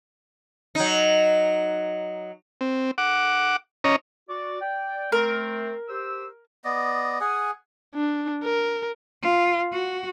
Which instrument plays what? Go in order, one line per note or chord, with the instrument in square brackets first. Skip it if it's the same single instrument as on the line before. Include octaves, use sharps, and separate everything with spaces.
[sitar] F#3 D#4
[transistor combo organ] C4
F#5 D6
C#4 C#5 D#5 A#5
[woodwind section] F#4 D5
D5 G5
[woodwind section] A3 C4 [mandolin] A#4
[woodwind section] G4 C5 E6
[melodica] B3 D5 D#5
G#4 F#5 G#5 D#6
[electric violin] D4
A#4
[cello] F4
F#4